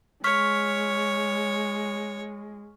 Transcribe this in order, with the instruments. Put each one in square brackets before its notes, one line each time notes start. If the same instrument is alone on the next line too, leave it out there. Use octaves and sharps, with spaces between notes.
[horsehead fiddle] G#3 [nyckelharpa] C#5 [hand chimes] C#6 F6 B6